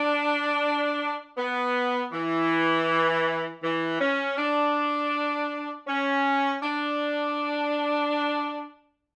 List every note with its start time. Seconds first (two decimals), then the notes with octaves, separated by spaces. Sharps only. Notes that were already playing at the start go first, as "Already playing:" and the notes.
Already playing: D4
1.37 B3
2.12 E3
3.62 E3
4.00 C#4
4.37 D4
5.87 C#4
6.62 D4